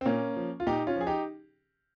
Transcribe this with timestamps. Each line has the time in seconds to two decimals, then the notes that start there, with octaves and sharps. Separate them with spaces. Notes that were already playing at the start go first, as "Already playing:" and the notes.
0.01 C4
0.05 A#2 A#3 C#4
0.36 F3
0.60 F4
0.67 A#2 D#4 G4
0.87 C#4 F4
0.96 F3 G#4
1.07 D#4 G4